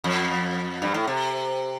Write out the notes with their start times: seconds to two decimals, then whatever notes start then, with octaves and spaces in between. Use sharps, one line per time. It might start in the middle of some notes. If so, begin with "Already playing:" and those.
0.04 F2
0.82 G2
0.94 A2
1.07 C3